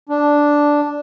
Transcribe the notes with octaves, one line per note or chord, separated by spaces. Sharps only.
D4